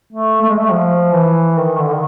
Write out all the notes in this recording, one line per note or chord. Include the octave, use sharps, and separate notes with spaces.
A3
A3
G#3
A3
F3
E3
D#3
D3
D#3